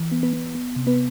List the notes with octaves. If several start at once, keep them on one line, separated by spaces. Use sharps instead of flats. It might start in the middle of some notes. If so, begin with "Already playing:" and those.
Already playing: E3
B3
B3 B4
B3
B3
C3
B3 B4